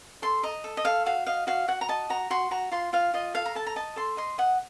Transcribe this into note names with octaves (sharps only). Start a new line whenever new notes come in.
A4 C6
D#5 A#5
A4
D#5
A4 F5
F#4 F5
D#5 F5
F#4 F5
F#4 F#5
A#5
D#5 A5
F#4 A#5
F#4 C6
F#4 A#5
F4 C6
F4 F5
F4 D#5
A4 F5
A#5
A4 A5
A#5
D#5 A5
A4 C6
D#5 C6
D#5 F#5